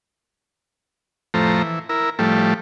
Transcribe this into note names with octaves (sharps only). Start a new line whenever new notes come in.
F2 A2 F3 A3 C5 A#5
E3
E4 A#4
A2 F3 G3 A3